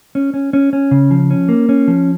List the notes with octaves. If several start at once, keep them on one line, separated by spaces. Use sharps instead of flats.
C#4
C#4
C#4
C#4
C#3
F3
C#4
A#3
C#4
F3